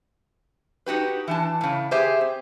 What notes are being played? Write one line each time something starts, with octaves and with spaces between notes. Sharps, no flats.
D#4 F#4 G4 B4
E3 D4 A5
A2 C#3
G4 G#4 C5 E5
C4